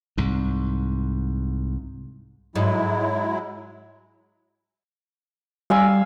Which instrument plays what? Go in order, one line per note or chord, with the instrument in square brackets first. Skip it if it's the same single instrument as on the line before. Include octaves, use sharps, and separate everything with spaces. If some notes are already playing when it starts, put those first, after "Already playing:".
[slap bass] C2 G#2
[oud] G#2 [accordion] F#3 G#3 E4
[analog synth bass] G3 [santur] F5 G#5 E6